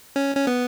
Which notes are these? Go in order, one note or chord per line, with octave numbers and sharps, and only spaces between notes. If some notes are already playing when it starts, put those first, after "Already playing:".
C#4
C#4
B3